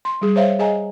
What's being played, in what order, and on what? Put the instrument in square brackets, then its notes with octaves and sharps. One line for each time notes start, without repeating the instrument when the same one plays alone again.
[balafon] C6
G3 G#4
C5 C#5 E5 F5
G#4 D#5 G#5 A#5